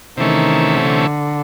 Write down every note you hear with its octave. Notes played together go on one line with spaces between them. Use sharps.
C3 D#3 E3 A3 C#4
D3